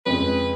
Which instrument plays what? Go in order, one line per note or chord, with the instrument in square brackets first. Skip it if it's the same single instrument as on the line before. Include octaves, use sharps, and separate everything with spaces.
[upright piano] F2 C#3 G#3 [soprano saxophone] B4